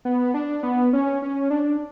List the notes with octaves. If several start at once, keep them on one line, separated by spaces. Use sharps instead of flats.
B3
D4
B3
C#4
C#4
D4